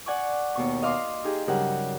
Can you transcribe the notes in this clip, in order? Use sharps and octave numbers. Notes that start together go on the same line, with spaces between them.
D5 F#5 G#5 C#6 D6
D#2 B2 C#6
D#5 F5 C6 D6 E6
D#4 G4 G#4
G2 C#3 F#3 G4 A#4 F#5